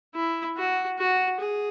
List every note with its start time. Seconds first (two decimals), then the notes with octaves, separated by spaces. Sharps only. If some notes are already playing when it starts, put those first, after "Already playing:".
0.15 E4
0.57 F#4
0.99 F#4
1.40 G#4